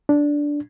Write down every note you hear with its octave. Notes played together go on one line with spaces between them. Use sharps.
D4